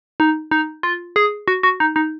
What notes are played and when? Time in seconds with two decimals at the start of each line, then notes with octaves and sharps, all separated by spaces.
0.20 D#4
0.51 D#4
0.83 F4
1.16 G#4
1.48 F#4
1.63 F#4
1.80 D#4
1.96 D#4